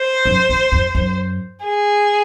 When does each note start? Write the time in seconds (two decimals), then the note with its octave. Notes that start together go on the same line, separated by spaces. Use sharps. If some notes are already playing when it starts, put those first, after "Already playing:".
Already playing: C5
0.25 F#2
0.49 F2
0.72 F2
0.95 F#2
1.63 G#4